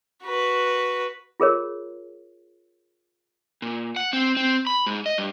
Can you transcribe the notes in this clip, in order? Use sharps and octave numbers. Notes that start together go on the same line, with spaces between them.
F#4 B4
F4 G#4 A#4 C#5
A#2
F#5
C4
C4
B5
G#2
D#5
G2